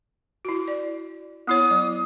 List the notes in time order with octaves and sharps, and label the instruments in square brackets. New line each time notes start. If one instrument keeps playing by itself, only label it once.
[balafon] E4 F#4
D5
[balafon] B3 E4 C#5 [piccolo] D#6
[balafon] F#3